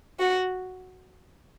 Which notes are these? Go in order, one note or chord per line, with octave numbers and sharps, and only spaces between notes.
F#4